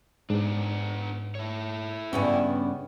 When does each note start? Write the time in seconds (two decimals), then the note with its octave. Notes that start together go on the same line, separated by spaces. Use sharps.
0.30 G#2 B3 D4
1.35 E4 C#5
2.13 G2 C#3 B3 C#4